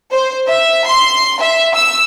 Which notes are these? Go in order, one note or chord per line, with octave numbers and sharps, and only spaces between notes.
C5
E5
C6
E5
E6